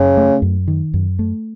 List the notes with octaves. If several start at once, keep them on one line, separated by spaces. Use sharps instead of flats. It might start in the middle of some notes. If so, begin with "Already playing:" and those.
Already playing: F#2 C#3
A3
F#2
D#3
F#2
A3